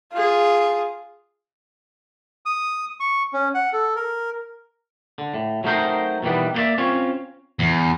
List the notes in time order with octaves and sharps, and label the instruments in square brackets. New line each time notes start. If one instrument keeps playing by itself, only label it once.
[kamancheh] F4 G#4
[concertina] D#6
C#6
C#4
F#5
A4
A#4
[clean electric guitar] D3
A2
F#3 A3 C4 D#4 A#4 C5
B2 D#3 E3 G3 B3
A#3 B3 C5 D5 E5
C4 C#4 F4 C#5
[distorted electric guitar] E2